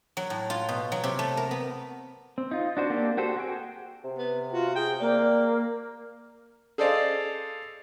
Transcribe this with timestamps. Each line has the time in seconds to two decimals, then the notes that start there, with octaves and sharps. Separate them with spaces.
0.17 F#3
0.30 A2
0.50 F4
0.69 B2
0.92 F#3
1.04 C3
1.19 A3
1.37 A#4
1.51 B3
2.38 C4
2.51 D#4 F4
2.77 D4 F#4 C5
2.90 A#3 C4 D4 G4
3.17 F#4 G4 A4 C5
3.36 F#4 G#4 G5
4.04 C3
4.18 B3
4.52 F4 F#4
4.76 G#4 G5
5.00 A#3 D5
6.78 G#4 A4 C5 D5 D#5 F5